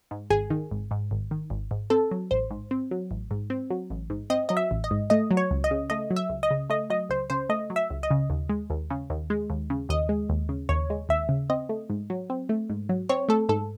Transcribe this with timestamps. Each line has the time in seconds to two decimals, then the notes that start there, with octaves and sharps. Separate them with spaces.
0.11 G#2
0.30 G#1 G#4
0.50 D#3
0.71 G#1
0.91 G#2
1.11 G#1
1.31 D#3
1.50 G#1
1.71 G#2
1.90 C4 A4
2.11 F#3
2.31 A1 C5
2.51 G#2
2.71 C4
2.91 F#3
3.11 A1
3.31 G#2
3.50 C4
3.70 F#3
3.90 A1
4.10 G#2
4.30 C4 D#5
4.49 F#3 D#5
4.57 E5
4.71 A1
4.84 D#5
4.91 G#2
5.10 A3 D#5
5.31 F#3
5.37 C#5
5.51 C#2
5.64 D#5
5.71 C#3
5.90 A3 D#5
6.11 F#3
6.16 E5
6.30 C#2
6.43 D#5
6.51 C#3
6.70 A3 D#5
6.90 F#3 D#5
7.09 C#2 C5
7.30 C#3 C5
7.49 A3 D#5
7.70 F#3
7.76 E5
7.90 C#2
8.03 D#5
8.11 C#3
8.30 D#2
8.49 G#3
8.70 D#2
8.90 C#3
9.10 D#2
9.30 G#3
9.50 D#2
9.70 C#3
9.89 D#2 D#5
10.09 G#3
10.30 D#2
10.49 C#3
10.69 D#2 C#5
10.90 G#3
11.09 D#2 E5
11.29 C#3
11.50 C4 D#5
11.69 A3
11.90 G#2
12.10 F#3
12.30 C4
12.49 A3
12.70 G#2
12.89 F#3
13.09 C4 C#5
13.29 A3 A4
13.49 G#2 A4